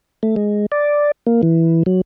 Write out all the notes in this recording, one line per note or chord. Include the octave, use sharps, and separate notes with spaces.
A3
G#3
D5
A#3
E3
F#3